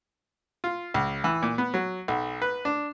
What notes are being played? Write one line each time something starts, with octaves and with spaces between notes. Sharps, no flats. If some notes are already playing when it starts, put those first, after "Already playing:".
F4
C#2
E3
A#2
B3
F#3
B1
B4
D4